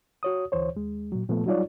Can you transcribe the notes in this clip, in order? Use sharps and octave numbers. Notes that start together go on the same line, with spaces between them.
F#4 C#5 D#6
D2 E3 C5 C#5
D#2 G#3
A#2 F#3
A#2 F3 A3 B3 A4
F#3 G3 D#4 F4 C#5 D5